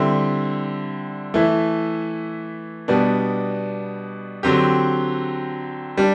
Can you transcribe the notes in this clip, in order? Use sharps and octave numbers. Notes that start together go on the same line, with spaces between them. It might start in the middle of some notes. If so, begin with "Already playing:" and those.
Already playing: D3 G3 C4 E4
E3 A3 E4
B2 G3 B3 D4
D3 F#3 C4 G4
G3 D4